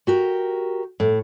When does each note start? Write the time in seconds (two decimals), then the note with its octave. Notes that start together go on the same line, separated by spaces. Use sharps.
0.07 F#4 G4 A#4
1.00 A2